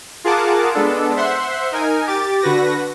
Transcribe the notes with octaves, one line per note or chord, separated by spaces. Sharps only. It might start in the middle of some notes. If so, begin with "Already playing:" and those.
F4 G#4 A#4 F#5 A5 D6
G#3 B3 D4 A4
C5 E5 F#5 C6
D#4 A#4 G#5
G4 D6 A6
D3 F#4 B4 A#6